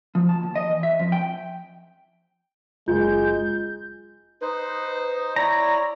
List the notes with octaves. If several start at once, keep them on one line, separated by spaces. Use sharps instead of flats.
F3
A5
D#2
D#5
E3
E5
F2
G5
F#1 G#3 F4 G6
D#4 B4 C5
E4 C#5 D5 A#5